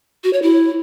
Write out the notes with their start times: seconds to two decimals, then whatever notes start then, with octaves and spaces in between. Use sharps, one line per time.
0.24 F#4
0.33 C#5
0.42 E4